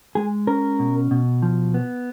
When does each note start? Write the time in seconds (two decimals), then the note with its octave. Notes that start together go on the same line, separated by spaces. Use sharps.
0.15 G#3 G#4
0.47 C#4 A#4
0.79 B2
1.11 B2
1.42 F3
1.74 B3